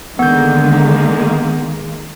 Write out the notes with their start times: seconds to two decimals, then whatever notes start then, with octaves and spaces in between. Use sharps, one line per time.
0.19 D3 D#3 G#3 A#3 B3 G6